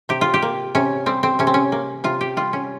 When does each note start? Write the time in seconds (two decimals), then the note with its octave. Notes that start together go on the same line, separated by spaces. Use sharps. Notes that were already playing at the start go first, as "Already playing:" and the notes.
0.09 C3 G4
0.21 F4
0.34 G4
0.42 A#3
0.75 C3 C#4
1.06 G3 C4
1.23 C4
1.39 C3 C#4
1.47 C4
1.54 C#4
1.72 A#3
2.04 C3 F4
2.21 G4
2.37 G3 F4
2.53 C#4